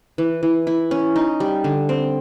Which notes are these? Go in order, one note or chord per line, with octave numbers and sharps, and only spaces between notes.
E3
E3
E4
C#4
D#4
G3
D3
C4